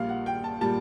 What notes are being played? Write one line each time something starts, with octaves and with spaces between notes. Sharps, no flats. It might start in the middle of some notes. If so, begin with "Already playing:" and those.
Already playing: A#1 A#2 G3 F5
F#5
G5
A5
A#2 G3 A5